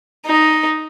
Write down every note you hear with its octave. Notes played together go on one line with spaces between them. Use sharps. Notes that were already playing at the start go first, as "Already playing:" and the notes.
D#4